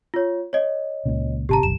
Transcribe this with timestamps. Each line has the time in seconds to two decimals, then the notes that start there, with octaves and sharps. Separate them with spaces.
0.14 F4 C#5
0.53 C#5 D#5
1.06 C#2 A#2 C#3
1.49 G#1 C3 G4 A5 A#5
1.63 F#1 B1 E7